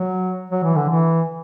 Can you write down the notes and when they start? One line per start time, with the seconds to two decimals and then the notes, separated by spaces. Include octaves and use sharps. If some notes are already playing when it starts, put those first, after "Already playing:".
Already playing: F#3
0.50 F#3
0.63 E3
0.76 D3
0.89 E3